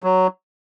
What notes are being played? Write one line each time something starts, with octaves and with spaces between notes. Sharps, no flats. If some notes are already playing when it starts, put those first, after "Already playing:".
F#3